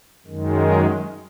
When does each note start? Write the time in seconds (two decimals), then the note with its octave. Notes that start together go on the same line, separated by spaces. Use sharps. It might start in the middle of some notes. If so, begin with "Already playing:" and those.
0.26 F#2 D#3 G#3
0.64 A#4